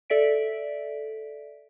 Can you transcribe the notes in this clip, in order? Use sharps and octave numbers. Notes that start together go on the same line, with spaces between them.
A4 D5 E5 B6 D7